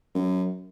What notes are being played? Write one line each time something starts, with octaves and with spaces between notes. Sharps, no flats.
F#2